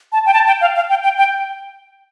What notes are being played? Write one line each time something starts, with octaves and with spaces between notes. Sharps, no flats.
A5
G5
A5
G5
F5
F5
G5
G5
G5